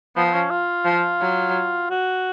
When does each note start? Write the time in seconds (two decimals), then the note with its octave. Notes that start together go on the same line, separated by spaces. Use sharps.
0.16 F3 B3
0.27 B3
0.34 C#4
0.51 F4
0.85 F3
1.21 F#3
1.91 F#4